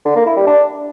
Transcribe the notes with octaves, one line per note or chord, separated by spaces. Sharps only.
D3
A#3
E4
G3
D4